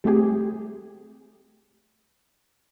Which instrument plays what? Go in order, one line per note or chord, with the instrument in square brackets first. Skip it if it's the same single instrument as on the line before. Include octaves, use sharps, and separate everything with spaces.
[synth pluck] G3 A3 C4 G4 G#4